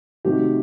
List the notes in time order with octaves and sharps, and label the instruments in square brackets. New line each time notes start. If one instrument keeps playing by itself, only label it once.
[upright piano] C3 D#3 F#3 A3 G4